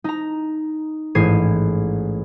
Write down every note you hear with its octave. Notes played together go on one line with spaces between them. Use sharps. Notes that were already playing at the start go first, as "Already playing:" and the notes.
D#4 A#5
A1 G#2 G#4 G#6 C7 D#7